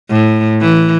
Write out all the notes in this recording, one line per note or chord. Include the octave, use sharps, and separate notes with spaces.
A2
E3